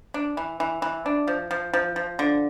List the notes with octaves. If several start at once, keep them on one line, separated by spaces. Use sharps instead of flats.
D4
E3
E3
E3
D4
F3
F3
F3
F3
D3